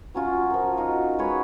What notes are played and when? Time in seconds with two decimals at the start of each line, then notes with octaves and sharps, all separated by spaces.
0.14 F#3 C#4 F4
0.50 F3 A#4
0.77 D#4 F4 F#4
1.18 G#3 B4 C#5